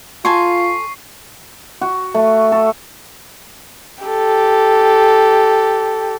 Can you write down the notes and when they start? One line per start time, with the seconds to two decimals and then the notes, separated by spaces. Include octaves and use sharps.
0.25 F4 A4 G#5 C6 C#6 C7
1.81 F#4
2.15 A3
2.52 A4
4.04 G4 A4